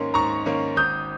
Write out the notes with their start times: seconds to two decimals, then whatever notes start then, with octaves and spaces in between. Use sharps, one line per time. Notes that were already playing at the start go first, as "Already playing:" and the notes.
Already playing: G#2 D#3 A#3 C#4 C6
0.14 G#2 A#5 C#6
0.46 D#3 A#3 C#4
0.76 G#1 D#6 G6